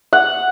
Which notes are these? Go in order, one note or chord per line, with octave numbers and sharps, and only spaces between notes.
F#5